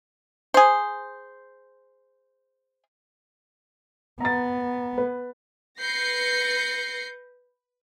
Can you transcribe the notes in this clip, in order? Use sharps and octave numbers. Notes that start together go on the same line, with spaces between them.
G#4 C5
B3 A#5 A6
B4
B4 G6 A#6 C7 C#7